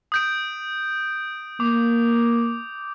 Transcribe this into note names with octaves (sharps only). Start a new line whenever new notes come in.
D#6 G6 D7
A#3 D6